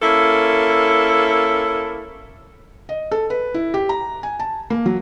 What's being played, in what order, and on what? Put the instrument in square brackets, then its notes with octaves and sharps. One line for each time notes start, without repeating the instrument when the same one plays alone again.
[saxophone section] A#3 C#4 E4 A4
[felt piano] D#5
A4
B4
E4
G4
A#5
G#5
A5
A#3
F#3